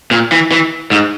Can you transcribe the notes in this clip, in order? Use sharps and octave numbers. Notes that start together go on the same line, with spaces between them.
A#2
E3
E3
G#2